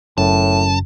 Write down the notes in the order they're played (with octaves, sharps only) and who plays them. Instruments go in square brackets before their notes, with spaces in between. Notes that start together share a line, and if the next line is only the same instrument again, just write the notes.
[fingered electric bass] F#1 [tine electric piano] F#2 [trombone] A2 [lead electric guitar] A5